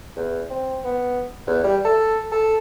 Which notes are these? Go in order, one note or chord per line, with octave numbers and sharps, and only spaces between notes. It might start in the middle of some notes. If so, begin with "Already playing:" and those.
E2
C4
B3
E2
G3
A4
A4